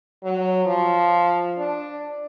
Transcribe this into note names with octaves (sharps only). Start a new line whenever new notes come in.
F#3
F3
D4